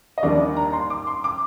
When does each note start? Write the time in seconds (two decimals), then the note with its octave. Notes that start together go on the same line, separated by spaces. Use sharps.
0.18 D#5
0.22 D#2 D#3 G3 A#3 D4 D5
0.57 A#5
0.73 C6
0.90 D6
1.07 C6
1.24 D6